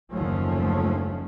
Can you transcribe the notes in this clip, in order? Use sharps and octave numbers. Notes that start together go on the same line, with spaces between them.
F#1 D#2 D3 F3 A3 C#4